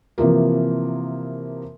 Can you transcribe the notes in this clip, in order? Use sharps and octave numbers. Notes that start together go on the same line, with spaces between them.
C3 E3 F3 A#3